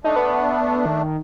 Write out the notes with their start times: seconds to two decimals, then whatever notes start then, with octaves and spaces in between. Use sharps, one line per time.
0.04 A3 D4 D#4
0.16 B3
0.86 D#3